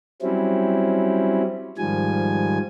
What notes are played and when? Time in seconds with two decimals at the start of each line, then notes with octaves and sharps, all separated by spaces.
0.22 F#3 G3 C4 C#4 E4
1.78 G#2 D#3 F3 G3 G#5